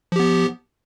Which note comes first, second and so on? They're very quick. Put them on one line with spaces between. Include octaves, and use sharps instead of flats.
F3 G4 B3